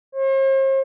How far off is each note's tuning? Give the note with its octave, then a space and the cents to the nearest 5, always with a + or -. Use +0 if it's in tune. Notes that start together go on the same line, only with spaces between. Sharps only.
C5 +45